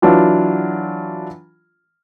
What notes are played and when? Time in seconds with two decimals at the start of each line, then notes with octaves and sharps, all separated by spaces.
0.02 E3 F#3 D4 F4